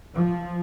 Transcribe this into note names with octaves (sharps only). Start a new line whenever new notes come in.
F3